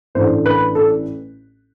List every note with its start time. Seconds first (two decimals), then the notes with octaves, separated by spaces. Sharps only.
0.15 A1 A2 E3 A3 D4 C5
0.46 B4
0.75 A4